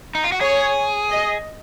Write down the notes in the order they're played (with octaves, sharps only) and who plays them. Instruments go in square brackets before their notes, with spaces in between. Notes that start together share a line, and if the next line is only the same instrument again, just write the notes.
[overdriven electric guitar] D#4
F4
F#4
[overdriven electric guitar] G#4 [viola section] C#5
[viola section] D#5